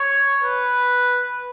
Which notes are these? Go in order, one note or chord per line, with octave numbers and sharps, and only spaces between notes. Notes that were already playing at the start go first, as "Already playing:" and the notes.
Already playing: C#5
B4